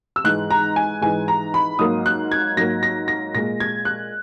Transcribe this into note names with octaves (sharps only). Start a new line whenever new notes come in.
E6
G#2 E3 G#3 F#6
A#5
G#5
G#2 E3 G#3 G#5
A#5
B5
G#2 F#3 A#3 D#6
F#6
G#6
G#2 F#3 A#3 A#6
A#6
A#6
A#2 G#3 A#6
G#6
F#6